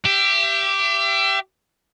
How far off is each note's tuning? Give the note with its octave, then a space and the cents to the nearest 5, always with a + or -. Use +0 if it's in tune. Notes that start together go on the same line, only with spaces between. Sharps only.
G4 -5 E5 +35